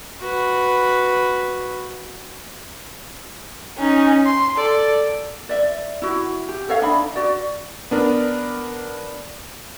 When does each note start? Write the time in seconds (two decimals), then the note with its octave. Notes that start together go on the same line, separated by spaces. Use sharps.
0.20 F#4 B4
3.78 C#4 D#4
4.26 C6
4.57 A4 D5
5.49 D5 E5
6.02 E4 F#4
6.49 G4
6.69 A4 C#5 E5 F5
6.82 D4 D#4 B5
7.16 F#4 D5
7.91 B3 D4 A#4